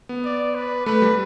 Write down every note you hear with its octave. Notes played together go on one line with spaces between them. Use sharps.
B3
D5
B4
A3 B4
G3